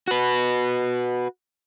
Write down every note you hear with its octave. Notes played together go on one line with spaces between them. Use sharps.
F#4 B4